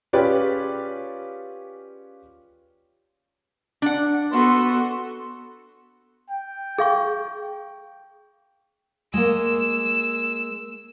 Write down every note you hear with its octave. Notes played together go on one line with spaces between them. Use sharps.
C#4 F4 G4 G#4 B4 D5
D4 F#5
B3 F#4 A4 C6
G5
G#4 F5 C#6
G#3 A#3 E6